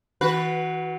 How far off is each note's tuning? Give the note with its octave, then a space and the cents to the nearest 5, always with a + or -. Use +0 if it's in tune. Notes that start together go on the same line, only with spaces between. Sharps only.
E3 -35 F#4 +0 B4 -10